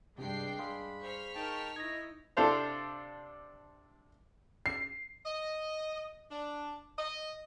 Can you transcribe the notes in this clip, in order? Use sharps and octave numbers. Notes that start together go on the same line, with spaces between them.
G2 C3 G#3 D4 G5 C7
G#4 F5 B5 C6
C5 C#6 F6 B6
D#4 A#4 G5 A5
D#4 E4 D#5 G#6 A#6
C3 D4 A4 C5 F5
C7
D#5
D4
D#5